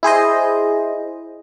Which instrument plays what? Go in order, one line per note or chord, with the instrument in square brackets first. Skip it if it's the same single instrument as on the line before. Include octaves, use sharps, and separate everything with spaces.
[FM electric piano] E4 G#4 C5 D#5